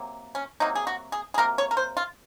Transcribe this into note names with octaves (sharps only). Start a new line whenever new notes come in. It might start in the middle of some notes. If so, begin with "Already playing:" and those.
Already playing: C3 F#3 A#3
C#4
C3 F#3 A#3 D#4
G#4
F#4
G#4
G#4
C3 F#3 A#3 A#4
C#5
A#4
C5
F4